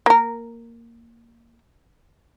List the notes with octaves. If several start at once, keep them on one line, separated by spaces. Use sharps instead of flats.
A#3 A#4